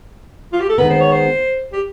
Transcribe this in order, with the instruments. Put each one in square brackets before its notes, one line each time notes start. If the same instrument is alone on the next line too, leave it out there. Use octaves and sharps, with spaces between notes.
[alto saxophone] F4
G4
A4
[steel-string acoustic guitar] D#3 G#3 B3 [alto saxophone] B4
[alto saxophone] C5
C#5
C5
G4